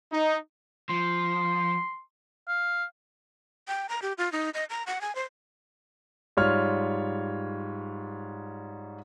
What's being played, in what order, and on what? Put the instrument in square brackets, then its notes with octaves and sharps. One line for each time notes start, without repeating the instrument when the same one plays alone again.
[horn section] D#4
[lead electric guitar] F3 [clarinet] C6
[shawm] F5
[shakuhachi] G5
A#5
G4
F4
D#4
D#5
A#5
F#5
G#5
C5
[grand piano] G#2 G3 F4 C#5 F6